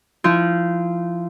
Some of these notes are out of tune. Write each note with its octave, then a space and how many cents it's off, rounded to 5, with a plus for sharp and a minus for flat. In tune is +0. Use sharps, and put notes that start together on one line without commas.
F3 -20 E4 -20